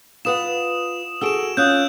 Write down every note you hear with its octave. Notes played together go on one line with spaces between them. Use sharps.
F4 B4 F#5 D#6 E7
F#4 G#4 A4 E6 D7 E7
C#4 F4 D#6 F#6 G6